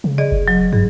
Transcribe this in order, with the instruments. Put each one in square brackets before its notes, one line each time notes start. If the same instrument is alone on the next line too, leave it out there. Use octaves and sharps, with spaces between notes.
[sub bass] C#3
[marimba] G#4 D5 D#5
[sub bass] F#1
[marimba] F#3
[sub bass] G2 [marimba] G#4